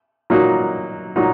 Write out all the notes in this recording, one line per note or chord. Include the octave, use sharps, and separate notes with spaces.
A#2 F#3 A#3 D#4 F#4
A#2 F#3 A#3 D#4 F#4